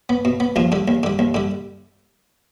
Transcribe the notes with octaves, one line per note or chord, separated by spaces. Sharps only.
B3
B2
B3
D#2 F3 F4
D3 G3
D#2
D3 G3
D#2
D3 G3